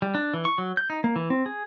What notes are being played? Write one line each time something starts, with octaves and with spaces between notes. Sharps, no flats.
G3
D4
E3
C#6
F#3
G6
D#4
A#3
E3
C4
G#4